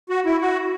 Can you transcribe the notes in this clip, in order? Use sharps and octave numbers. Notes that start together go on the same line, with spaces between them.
F#4
E4
F#4